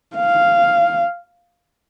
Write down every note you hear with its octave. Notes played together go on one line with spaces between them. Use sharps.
F5